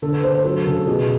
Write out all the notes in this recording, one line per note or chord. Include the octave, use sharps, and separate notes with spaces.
D3 A4
B4
D3 C5
C5
F#3 A4
C#3 A4
B2 G#4